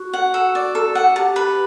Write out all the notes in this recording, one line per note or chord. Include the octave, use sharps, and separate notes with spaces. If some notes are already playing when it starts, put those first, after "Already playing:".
Already playing: F#4
F#5
A4
D5
A4
F#5
G4 A5
B4